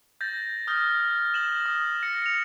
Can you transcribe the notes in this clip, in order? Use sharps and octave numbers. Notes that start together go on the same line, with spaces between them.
G6 A6 A#6
D#6 F6 G6 A#6
E7 F#7
D#6
A#6 C#7
C#7 F7